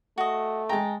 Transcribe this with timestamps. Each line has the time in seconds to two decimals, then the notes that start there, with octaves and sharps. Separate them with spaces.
0.18 A3 F#4 D#5
0.69 G#3 G5 A5 A#5